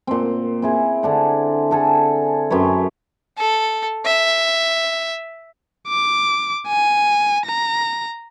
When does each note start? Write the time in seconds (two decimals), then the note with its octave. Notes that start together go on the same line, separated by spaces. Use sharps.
0.07 A#2 C4
0.62 C4 E4 G#4
1.03 D3 D4 F#5
1.71 G#4 A4 F#5
2.50 F#2 C4 B4 C#5
3.38 A4
4.06 E5
5.88 D6
6.68 G#5
7.46 A#5